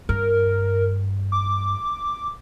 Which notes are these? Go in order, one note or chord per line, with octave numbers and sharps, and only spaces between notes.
G2 A#4
D6